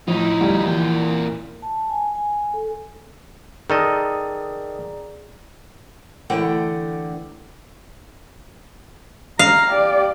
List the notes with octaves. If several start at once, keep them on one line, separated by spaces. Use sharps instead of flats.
A2 F3 D#4 E4
D2 G3 F5
E2 A#2 G5
A5
G#5
G#5
A4
D#3 G#4 A4 D5 D#5 A#5
D3 E3 A3 F#5 G5
F5 A#5
G4 D5